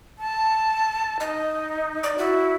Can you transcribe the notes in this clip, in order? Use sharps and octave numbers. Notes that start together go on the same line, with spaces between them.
A5
D#4 D#5
D5
E4 F#4